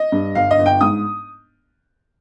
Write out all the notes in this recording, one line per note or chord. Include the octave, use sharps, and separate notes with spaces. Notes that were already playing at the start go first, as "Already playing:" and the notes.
Already playing: D#5
G2
G1 F5
D#5
G1
G5
G#2 D#6